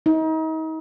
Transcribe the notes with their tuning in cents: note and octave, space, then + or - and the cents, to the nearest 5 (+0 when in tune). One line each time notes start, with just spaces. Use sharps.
D#4 +35